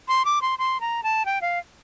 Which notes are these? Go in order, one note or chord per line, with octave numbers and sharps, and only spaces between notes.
C6
D6
C6
C6
A#5
A5
G5
F5